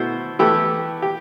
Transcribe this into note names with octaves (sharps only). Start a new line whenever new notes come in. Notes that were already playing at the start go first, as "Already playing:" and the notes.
Already playing: B2 A3 E4 C5
E3 A3 E4 G4
G4